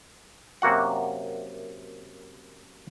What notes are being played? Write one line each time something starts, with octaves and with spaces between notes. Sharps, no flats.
F#2 C3 A#3 F#4 F#5